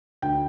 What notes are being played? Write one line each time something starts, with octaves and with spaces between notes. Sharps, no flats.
D2 G5